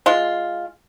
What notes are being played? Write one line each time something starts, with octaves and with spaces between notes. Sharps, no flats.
G#3 F4